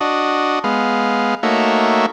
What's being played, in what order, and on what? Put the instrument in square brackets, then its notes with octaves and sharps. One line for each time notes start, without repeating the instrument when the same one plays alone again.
[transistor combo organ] D4 F#4 D#5
G#3 B3 F5
A3 A#3 D#4 F#4 C#5 E5